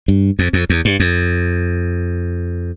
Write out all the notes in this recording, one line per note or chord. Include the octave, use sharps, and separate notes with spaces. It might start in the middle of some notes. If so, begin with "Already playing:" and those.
G2
F2
F2
E2
G2
F2